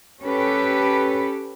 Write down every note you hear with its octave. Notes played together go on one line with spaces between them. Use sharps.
C#4 G4 A4 B4